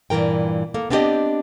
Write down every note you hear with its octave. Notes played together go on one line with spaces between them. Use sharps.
G2 A#2 E3 A#4 G5
A#3 A4
B3 C4 D4 F4 G4 D#5